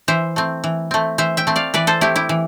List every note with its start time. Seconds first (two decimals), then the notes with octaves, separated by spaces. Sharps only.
0.08 E3 C5 E5
0.36 A3 C4
0.64 E3
0.91 A3 C4
1.18 E3 C5 E5
1.37 E5 G5
1.47 A3 C4
1.56 D5 F5
1.74 E3 B4 D5
1.87 A4 C5
2.01 A3 C4 E4 G4
2.16 E4 G4
2.29 E3